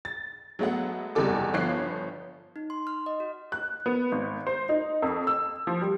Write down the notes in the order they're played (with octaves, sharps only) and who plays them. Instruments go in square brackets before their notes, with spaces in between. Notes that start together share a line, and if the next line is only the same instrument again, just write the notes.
[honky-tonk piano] A6
F#3 G#3 A3 B3 F#5
F#1 E2 C3 G3 A4 D6
G1 F3 B3 C#5 F#6 C7
[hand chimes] D#4
C6
F6
D#5
F#4
[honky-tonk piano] F#6
B3
G#1
C5
D#4
F2
E6
F3
G3